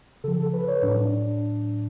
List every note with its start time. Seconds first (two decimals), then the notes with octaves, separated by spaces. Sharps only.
0.24 C#3 F3 A4
0.39 A4
0.53 B4
0.68 C#5
0.82 A2 F#3 D4
0.97 D4